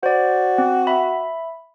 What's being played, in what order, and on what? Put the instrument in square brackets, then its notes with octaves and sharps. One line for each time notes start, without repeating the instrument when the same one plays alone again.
[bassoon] F#4 [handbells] C5 D5
[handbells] C4
E5 B5